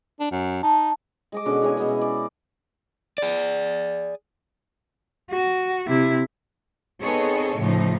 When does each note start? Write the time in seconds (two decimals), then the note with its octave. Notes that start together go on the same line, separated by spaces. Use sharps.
0.20 D4
0.32 F#2
0.63 D#4 A5
1.32 G#3 D#5 D6
1.46 B2 D3 C#4 D6
1.61 E3 G#3 C#4 G#5
1.77 B2 B3 D#5
1.89 E4
2.01 D5
3.18 G#4 D5
5.31 F#4
5.87 C3 E4
7.00 B3 C4 D#4 G#4 A4 C#5
7.57 A2 C#3 F3 A3 D#4